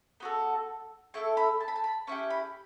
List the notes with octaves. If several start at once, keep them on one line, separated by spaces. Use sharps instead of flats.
B3 F#4 A4
A3 E4 A4 C#6
B5
A5
B5
A5
B5
C#4 E4 G4 C#6
B5